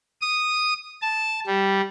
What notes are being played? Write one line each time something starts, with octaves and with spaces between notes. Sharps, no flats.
D#6
A5
G3